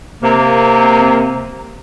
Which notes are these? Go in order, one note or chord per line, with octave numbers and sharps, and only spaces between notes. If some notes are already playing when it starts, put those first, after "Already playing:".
C3 A#3